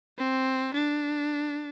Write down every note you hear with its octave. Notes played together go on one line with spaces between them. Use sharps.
C4
D4